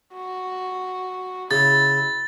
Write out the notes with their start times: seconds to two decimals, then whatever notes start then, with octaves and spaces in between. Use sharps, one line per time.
0.13 F#4
1.51 C#3 E4 A6